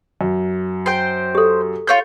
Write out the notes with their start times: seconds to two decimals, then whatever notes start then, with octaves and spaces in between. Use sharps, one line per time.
0.21 F#2
0.86 C5 G5
1.35 G4 A4
1.88 F4 C#5 G6